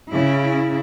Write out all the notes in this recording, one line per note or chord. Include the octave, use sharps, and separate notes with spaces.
C#3 E4